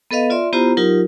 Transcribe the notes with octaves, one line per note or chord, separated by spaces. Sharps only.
B3 A4 B4 D#5 F5
F4 D5 E5 C6
B3 E4 F4 G4 C5 A#5
F#3 D#4 F4 G4 A#4